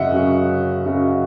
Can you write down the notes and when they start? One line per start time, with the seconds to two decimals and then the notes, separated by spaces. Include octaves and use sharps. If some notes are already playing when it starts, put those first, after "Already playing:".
Already playing: F#2 C#3 F#3 D#5 E5 F#5
0.11 F#2 C#3 F#3
0.86 F#2 C#3 F#3